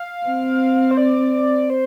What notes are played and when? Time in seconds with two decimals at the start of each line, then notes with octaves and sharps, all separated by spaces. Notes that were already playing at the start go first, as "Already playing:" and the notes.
Already playing: F5
0.27 C4
0.91 C5
0.97 D5
1.70 C5